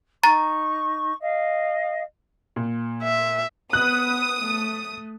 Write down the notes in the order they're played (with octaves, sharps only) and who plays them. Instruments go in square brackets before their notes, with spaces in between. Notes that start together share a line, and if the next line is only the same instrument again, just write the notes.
[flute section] D#4 C#6 [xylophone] A#5 A6
[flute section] D#5 F5
[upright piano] A#2
[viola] E5
[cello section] B3 [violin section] D#6 [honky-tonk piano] F#6
[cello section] A3